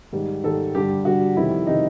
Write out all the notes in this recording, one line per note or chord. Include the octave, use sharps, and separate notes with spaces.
G#2 D#3 G3
G#2 D#3 G3 A4
G2 D3 G3 G4
G2 D3 G3 F#4
F2 C3 D#3 G3 E4
C3 D#3 G3 D#4